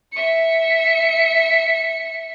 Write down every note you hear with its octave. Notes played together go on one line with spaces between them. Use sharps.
E5 C#7